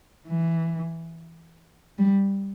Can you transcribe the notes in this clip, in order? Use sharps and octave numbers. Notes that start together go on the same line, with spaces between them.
E3
G3